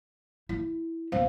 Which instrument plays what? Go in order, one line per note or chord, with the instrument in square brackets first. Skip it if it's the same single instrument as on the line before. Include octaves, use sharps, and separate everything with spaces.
[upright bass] E4
[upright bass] C#2 B2 [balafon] C5 F5